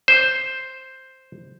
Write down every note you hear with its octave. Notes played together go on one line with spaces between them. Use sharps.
C5